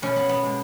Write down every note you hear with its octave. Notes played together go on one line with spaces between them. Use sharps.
B2 A3 C#4
B3
B3
B2 G#3